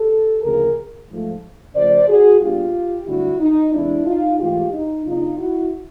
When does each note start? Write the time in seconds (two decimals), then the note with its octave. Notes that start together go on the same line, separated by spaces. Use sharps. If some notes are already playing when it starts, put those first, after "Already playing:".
Already playing: G4 A4
0.43 D2 C#3 F3 A#3 G#4 A#4
1.09 G#2 F3 A3
1.75 C#3 F3 A3 C5 D5
2.08 F#4 G#4
2.41 A#2 G3 B3 D4 F4 G4
3.07 G2 D3 F#3 A3 D4 E4 F#4
3.40 D#4
3.73 E2 C3 E3 G#3 C4 D4 E4
4.06 D#4 F4
4.39 G#2 E3 A3 F4 G4
4.72 D#4
5.05 C#3 F#3 B3 D4 D#4 F4
5.38 E4 F#4